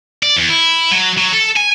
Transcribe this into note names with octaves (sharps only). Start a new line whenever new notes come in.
D5
E2
E4
F#3
F#3
A4
G#5